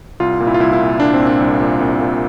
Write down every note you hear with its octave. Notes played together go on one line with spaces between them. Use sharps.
C2 F4
A#2
E4
F4
C2 E4
E4
A#2
C2 D4
C4
A#2
D4
C2
A#2
C2
A#2